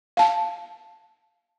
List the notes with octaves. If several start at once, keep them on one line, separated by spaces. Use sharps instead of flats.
F5 A5